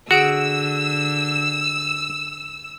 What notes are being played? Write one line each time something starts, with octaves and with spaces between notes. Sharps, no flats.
D3 F#4 G#4 F#5 E6 D7